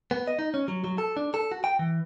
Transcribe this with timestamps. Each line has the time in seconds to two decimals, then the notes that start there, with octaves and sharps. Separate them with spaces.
0.11 B3
0.27 D#5
0.39 D#4
0.54 C#4
0.68 F#3
0.84 F#3
0.98 A4
1.17 D4
1.34 A4
1.52 F#4
1.64 G5
1.79 E3